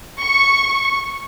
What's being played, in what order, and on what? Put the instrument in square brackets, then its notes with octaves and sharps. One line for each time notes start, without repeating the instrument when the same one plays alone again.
[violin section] C#6